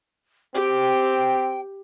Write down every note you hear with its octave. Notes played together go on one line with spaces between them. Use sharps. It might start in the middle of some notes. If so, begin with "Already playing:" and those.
C4 G4 G5